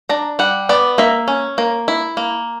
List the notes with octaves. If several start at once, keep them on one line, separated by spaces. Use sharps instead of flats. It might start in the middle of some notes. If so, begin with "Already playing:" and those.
D4 A#5
G3 F#5
B3 D5
A#3 E5
C#4
A#3
E4
A#3